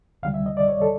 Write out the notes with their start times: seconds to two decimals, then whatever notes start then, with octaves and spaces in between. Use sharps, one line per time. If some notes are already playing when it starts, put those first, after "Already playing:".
0.23 D2 C3 D#3 G3 F5
0.34 E5
0.46 D#5
0.57 D5
0.68 C#5
0.82 A4